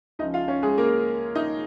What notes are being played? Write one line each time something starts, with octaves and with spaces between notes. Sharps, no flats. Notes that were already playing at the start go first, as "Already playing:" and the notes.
C#2 C#3 F3 D#4 D#5
F4 F5
C#4 C#5
G#3 G#4
A#3 A#4
D#4 D#5